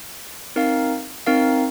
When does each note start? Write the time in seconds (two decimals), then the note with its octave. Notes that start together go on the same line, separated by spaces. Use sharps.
0.56 C4 D#4 A#4 F5
1.26 C4 D#4 A#4 F5